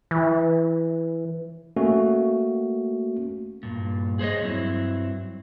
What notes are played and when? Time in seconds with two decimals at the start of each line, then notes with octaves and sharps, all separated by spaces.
0.11 E3
1.76 A3 A#3 C#4 F#4
3.63 G2 A#2
4.19 G#4 C5 C#5 D#5
4.41 G2 F#3 C4 E4